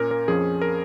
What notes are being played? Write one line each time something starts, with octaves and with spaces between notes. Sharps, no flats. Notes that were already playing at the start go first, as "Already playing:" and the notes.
Already playing: A#2 A#3 C#4 A#4
A#4
F2 F3 C#4 G#4
A#4